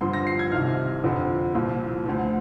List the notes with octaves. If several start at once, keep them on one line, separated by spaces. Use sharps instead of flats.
G2 D3 F3 C6
A#6
C7
G#6
C2 C3 D#3 F6
F2 D3 F3
C2 A#2 F3
D2 D3 F3